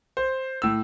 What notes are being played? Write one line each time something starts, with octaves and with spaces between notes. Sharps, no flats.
C5
A2 E6